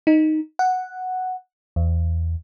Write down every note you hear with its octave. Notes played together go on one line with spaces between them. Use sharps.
D#4
F#5
E2